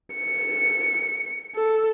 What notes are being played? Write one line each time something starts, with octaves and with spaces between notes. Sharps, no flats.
C#7
A4